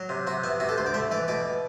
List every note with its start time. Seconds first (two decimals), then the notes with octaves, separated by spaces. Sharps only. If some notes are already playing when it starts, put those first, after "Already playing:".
Already playing: F#3
0.09 C3
0.27 C3 F#4
0.44 B3 E4
0.60 C3 F#4
0.69 A4
0.78 D2 C5
0.86 D5
0.94 A3 E5
1.11 E3 D5
1.28 B2 D5